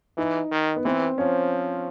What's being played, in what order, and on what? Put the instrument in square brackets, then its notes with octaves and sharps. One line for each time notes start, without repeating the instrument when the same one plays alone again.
[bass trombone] E3 [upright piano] D#4
[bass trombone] D#3
[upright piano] B3
[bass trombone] E3 [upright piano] C4
[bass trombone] F3 [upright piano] C#4